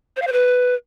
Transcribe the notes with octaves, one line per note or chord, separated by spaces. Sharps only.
C5
F5
C5
B4